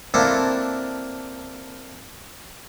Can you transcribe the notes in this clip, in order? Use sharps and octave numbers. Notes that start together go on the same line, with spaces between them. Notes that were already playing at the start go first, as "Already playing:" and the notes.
A#3 C4 D4 E4 A4